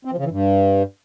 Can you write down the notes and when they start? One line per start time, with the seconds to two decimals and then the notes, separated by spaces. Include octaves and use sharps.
0.05 C4
0.12 F3
0.18 C#3
0.25 E3
0.31 G2